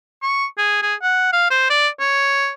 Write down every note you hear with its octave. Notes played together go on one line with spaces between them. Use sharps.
C#6
G#4
G#4
F#5
F5
C5
D5
C#5